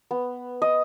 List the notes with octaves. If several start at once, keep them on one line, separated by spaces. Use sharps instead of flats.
B3
D#5